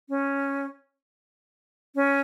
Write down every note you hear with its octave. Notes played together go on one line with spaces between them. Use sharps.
C#4
C#4